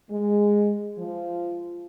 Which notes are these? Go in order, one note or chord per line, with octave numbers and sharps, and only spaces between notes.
G#3
F3